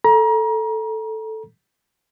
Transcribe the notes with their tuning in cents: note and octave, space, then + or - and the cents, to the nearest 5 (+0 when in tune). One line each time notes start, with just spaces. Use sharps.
A4 +0 A#5 +30